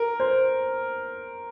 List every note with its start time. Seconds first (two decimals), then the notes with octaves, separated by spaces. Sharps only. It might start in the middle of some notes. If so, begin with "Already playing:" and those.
Already playing: A#4
0.20 C5